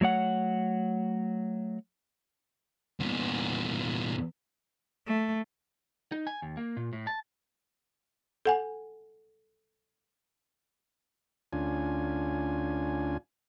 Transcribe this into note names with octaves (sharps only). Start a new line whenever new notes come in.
F#3 A3 C#5 F#5
E2 A#2
A3
D#4
G#5
D#2
A#3
A#2
A2
A5
A4 F#5 G#5
D2 C#4 D4 F4 G#5